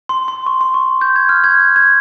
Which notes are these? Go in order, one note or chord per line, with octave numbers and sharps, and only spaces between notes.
C6
C6
C#6
C6
C#6
G6
G#6
F6
G#6
G#6